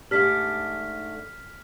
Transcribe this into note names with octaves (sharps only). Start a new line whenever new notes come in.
G#2 A3 D4 G4 F6 B6